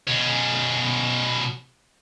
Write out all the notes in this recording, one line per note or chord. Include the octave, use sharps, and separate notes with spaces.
B2 C#4